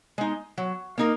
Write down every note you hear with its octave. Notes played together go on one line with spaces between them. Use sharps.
G#3 D#4
F#3
A#3 D#4 A#4